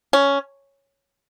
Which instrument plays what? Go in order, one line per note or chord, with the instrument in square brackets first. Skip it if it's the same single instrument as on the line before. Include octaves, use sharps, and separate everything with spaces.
[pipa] C#4